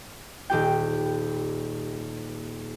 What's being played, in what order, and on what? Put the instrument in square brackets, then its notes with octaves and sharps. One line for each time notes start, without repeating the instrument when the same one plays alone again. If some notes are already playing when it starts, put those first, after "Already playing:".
[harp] D#1 G4 G5